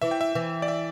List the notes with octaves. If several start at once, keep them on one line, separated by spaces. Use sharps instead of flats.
E3 E5
G5
E5
E3
D5
E5